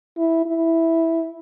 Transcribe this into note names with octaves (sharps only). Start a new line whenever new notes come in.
E4
E4